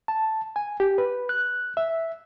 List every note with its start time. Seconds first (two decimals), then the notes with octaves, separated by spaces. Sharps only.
0.08 A5
0.56 G#5
0.80 G4
0.98 B4
1.29 F#6
1.77 E5